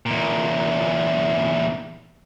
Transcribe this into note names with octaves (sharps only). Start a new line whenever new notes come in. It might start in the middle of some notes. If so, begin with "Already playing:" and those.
E2 A#2